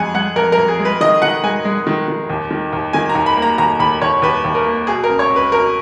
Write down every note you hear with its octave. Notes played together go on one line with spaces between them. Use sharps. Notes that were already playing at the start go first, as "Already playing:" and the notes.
Already playing: F2 G#3 F#5 G#5
G#3 F#5
F2 A#4
A#4
F2
G#4
G#3
B4
D#3 D#5
D#3 F#5
G#3 G#5
G#3
D#3
D#3
D#2
D#3
D#2
D#3 G#5
A#5
D#2
B5
A#3
A#5
D#2 A#5
D#2 B5
D#2 C#5
D#2 B4
D#2
A#4
A#3
B2 G#4
A#4
C#2
C#5
C#2
B4
B2 A#4